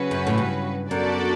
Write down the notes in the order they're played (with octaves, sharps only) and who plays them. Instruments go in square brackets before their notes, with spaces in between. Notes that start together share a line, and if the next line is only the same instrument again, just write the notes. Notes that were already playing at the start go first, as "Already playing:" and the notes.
Already playing: [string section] C#3 F#3 C#4 F#4 B4
[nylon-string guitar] F#2
A2
G2
[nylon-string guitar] F#2 [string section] B3 D4 F#4 A4 D5